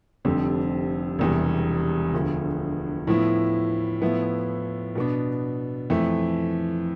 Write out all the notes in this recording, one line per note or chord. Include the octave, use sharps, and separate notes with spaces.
F1 F2 D3 G3 C4
E1 E2 C3 G3
E1 D2 D3 F3
A2 F3 B3 E4
A2 F3 B3 E4
B2 B3 D4
F2 E3 A3